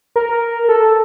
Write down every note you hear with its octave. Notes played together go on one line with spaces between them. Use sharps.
A#4
A4